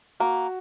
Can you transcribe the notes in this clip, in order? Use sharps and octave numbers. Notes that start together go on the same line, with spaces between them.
A#3 F#4